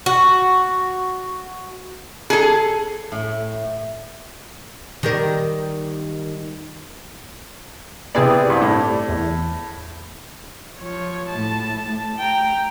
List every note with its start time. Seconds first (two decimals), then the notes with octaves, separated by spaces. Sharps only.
0.06 F#4
2.30 G#4 A4
3.12 A2
5.03 D#3 G3 A#4
8.15 C3 B3 C4 E4 G#4 D5
8.49 C2 G2
8.62 A2
9.09 E2
10.78 F3 C#5
11.29 A2 A5
12.18 G5 A#5